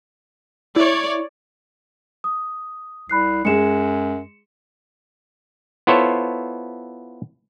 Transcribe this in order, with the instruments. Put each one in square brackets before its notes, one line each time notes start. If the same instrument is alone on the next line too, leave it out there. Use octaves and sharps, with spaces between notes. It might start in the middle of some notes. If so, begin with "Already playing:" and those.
[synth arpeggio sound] E4 [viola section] C#5 D5
[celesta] D#6
[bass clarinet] C2 [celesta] B5 F#6 C7
[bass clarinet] F#2 [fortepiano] G#3 G#4 [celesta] C#7 E7
[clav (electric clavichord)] B3 E4 F4 A4 C5 C#5